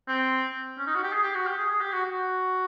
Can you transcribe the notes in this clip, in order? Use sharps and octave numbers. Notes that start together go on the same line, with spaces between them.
C4
C#4
D#4
F#4
G4
G#4
G4
F#4
G4
G#4
G#4
G4
F#4
F#4